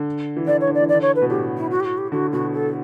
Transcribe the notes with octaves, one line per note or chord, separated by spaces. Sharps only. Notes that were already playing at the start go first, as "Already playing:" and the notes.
Already playing: D3
E3
D3 D5
C#5
D3
D5
E3
D5
D3
C#5
B4
B2
A2 G4
E4
F#4
G4
F#4
G4
D3 F#4
B2 F#4
A4